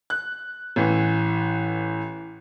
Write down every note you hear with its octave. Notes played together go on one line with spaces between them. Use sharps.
F#6
A1 E3